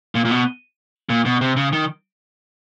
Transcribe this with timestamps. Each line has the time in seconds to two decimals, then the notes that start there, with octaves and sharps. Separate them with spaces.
0.15 A#2
0.25 A#2
0.31 B2
1.09 A#2
1.26 B2
1.41 C3
1.56 C#3
1.73 D#3